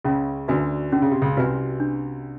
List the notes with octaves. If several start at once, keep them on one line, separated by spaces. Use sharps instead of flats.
C#2 C#3 C#4
D2 D3 F#4 B4 E5 G#5
D3 C#4
C#3
C3
C#2 C#3
C2 C3 F#4 B4 E5 G#5
D4